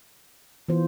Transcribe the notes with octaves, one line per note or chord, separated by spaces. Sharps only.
E3 B3 F4 C5